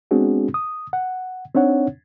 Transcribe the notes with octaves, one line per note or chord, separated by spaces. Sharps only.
G#3 B3 C4 D4 F#4 G#4
D#6
F#5
C4 D4 D#4 C#5 F#5